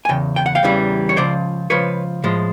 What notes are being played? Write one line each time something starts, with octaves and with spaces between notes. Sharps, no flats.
G#5
E2 C#3 G5
G5
F#5
F5 G5
E2 C#3 E3 G3
C#5
C#2 C#3 F3 C5 D5
C#2 C#3 F3 B4 C#5
A2 F3 G#3